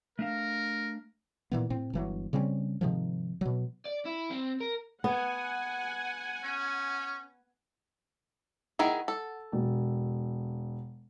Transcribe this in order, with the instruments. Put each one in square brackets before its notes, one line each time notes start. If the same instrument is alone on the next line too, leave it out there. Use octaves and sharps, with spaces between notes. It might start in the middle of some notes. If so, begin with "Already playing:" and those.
[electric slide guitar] A3 D4 F5 [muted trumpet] A#4
[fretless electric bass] A#2 E3 B3
A2 C4
G1 E3 F#3
C#3 G3 C4 C#4
G#2 C3 D#3 F3
B2 F#3
[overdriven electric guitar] D5
E4
C4
A#4
[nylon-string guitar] B3 [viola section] F#5 G#5
[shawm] C#4
[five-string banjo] D#3 E4 G#4 [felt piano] F#5
[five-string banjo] A4
[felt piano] E1